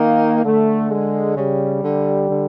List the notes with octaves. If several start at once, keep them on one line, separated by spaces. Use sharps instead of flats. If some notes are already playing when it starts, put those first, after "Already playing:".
Already playing: D#3 A#3
D3 A3
G#3
C#3 G3
D3
D3